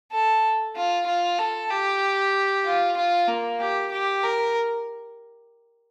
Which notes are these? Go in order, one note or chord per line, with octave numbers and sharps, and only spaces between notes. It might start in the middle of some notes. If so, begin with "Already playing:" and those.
A4
F4
F4
A4
G4
F4
F4
A#3
G4
G4
A#4